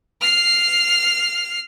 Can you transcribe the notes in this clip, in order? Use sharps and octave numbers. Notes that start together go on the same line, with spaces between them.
F6 C7